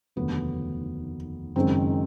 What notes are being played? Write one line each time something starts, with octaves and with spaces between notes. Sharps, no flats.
F1 D#2 D3 F#3 A3 B3
F#1 F#2 D#3 G#3 C4